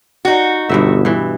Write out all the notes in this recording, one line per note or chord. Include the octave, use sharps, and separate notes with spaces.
D#4 F#4
G1 G2 B2 E5
G2 E3